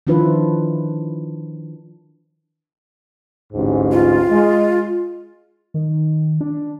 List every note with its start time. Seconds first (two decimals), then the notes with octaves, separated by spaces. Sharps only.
0.07 D#3 F3 D4 E4 F4 B4
3.53 A1 D2 G#2
3.92 F4
4.30 G#3
5.74 D#3
6.41 D4